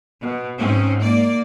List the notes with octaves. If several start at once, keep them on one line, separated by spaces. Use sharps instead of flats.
B2
G#2 C4 C#4
A#3 D5